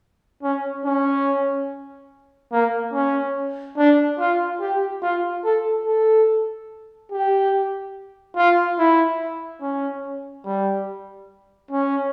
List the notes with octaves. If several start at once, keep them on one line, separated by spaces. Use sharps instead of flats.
C#4
C#4
A#3
C#4
D4
F4
G4
F4
A4
A4
G4
F4
E4
C#4
G3
C#4